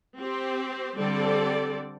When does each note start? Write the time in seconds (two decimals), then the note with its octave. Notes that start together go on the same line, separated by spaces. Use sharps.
0.18 C4 G4 C5
0.96 D3 G3 C4 A4 D5